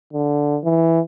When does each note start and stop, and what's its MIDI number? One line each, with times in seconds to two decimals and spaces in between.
0.13 0.58 50
0.64 1.00 52